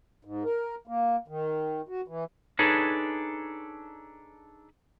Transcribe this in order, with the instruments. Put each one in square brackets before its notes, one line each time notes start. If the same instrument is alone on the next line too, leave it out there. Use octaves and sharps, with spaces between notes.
[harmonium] G#2
A#4
A#3
D#3
F#4
E3
[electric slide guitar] D4 D#4 G#4 A4 B4 C#5